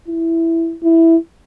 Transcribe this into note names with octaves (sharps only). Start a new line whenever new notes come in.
E4
E4